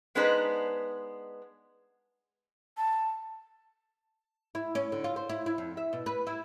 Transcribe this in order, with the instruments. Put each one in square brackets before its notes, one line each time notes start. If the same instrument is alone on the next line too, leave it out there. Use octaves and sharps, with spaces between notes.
[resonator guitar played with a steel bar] G#3 B3 D4 D#4 B4 C5
[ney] A5
[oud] E4
C#4
D3
F4
C5
E4
E4
F2
E5
B2
B4
E4